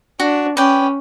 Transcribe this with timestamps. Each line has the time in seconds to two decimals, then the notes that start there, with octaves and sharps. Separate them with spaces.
0.20 D4 F#4
0.57 C#4 B4 D5 G5